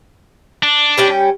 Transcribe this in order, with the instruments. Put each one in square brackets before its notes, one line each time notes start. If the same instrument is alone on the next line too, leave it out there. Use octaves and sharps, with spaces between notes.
[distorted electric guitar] D4
[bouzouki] G3 C#4 G5